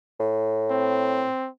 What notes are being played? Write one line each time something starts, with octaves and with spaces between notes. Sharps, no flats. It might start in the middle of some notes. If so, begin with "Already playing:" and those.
A2
C4